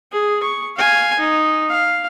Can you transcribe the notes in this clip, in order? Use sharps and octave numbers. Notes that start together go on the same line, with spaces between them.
G#4
C#6
F5 G#5
D#4
F5